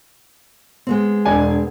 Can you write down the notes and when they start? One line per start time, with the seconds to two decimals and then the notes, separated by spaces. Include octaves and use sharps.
0.87 G#3 B3 C4
1.25 E1 D4 G#5